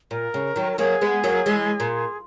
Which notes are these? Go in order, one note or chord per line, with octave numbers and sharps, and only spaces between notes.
A#2 A#4
C#3
D#3 F#3
A#4
F#3 A#3 G#4
G#3 B3
F#3 A#3
E3 G#3
A#2